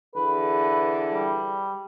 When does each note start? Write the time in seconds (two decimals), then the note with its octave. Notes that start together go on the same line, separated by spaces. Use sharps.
0.15 D3 E3 G#4 B4
1.13 G3